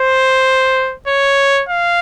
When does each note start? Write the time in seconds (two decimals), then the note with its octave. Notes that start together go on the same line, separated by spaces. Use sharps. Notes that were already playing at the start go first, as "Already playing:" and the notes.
Already playing: C5
1.08 C#5
1.69 F5